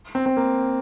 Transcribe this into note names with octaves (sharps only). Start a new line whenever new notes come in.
C4
C4
A#3